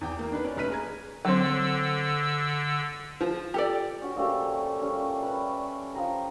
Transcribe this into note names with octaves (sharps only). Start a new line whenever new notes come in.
E2 G5 D6
A#3
D4 D#4 B4
C#4 D5
F1 B4 F6 B6 D#7
G#4 A#5 G#6
D3 F#3 C4 E6
F3
G4 A4 D5
C#4 F#4
A#2 F3 A3 G4
G3 C#4
B4
F3 G5 A#5